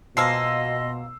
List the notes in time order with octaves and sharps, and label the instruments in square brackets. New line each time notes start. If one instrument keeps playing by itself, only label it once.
[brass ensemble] B2 [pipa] F3 G#3 A#3 [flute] D#5 [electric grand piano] C6 E6 C7